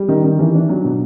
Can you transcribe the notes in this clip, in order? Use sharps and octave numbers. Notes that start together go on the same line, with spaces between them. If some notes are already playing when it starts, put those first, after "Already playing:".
Already playing: G3
D#3
D#3
E3
D4
F#3
B2